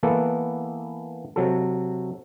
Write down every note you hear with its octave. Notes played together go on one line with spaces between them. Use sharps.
E3 A#3 B3 A4 F#5
C3 F#3 A4